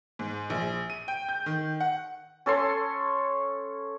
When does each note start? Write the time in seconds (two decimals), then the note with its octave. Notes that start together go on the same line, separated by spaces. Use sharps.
0.19 G#2
0.50 A#1
0.90 D#7
1.08 G5
1.29 G6
1.46 D#3
1.80 F#5
2.46 C#4 A4 C#5 C6